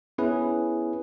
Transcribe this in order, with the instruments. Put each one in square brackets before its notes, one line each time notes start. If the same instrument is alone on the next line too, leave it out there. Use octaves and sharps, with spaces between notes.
[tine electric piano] B3 C#4 E4 G#4 B4